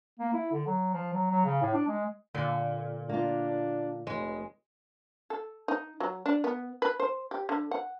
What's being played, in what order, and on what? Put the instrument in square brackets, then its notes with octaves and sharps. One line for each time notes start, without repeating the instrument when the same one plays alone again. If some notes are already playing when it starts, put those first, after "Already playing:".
[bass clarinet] A#3
E4
D3
F#3
F3
F#3
F#3
C#3
A2
D4
G#3
[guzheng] A#2 [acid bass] D3
[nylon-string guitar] A#3 F4 [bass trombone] D4
[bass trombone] F1 [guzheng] G#3 [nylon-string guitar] B4 C#5
[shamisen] A4
D#4
F#3
D4
B3
B4
C5
G4
D3
F#5